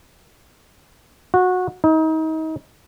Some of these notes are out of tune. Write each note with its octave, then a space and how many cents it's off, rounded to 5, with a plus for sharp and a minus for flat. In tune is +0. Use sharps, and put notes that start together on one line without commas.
F#4 -20
D#4 +30